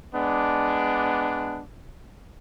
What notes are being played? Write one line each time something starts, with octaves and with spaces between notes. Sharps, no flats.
G#3 B3 D4